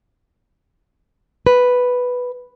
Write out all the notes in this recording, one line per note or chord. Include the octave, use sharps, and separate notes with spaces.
B4